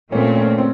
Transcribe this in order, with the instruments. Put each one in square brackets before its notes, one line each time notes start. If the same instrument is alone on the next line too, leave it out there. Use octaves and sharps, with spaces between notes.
[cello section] A#2 A3 C4 [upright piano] C#4
[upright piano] C#4
C4